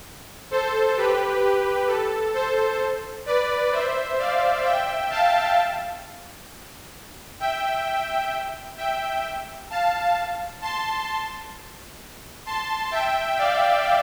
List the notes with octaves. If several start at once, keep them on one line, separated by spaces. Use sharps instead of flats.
A4 C5
G4 B4
G4
A4
A4 C5
B4 D5
C5 E5
D5 F5
E5 G5
F5 A5
E5 G5
E5 G5
F5 A5
A5 C6
A5 C6
E5 G5
D5 F5